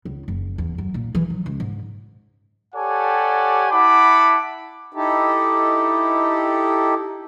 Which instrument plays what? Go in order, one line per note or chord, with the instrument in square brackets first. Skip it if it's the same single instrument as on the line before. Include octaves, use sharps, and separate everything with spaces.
[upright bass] C#2
F#1
E2
F#2
A#2
E3
F#3
C#2
G#2
[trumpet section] G4 A4 C#5 D5 F#5 G#5
E4 F#5 A5 B5 D6
[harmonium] D#4 E4 G4 A4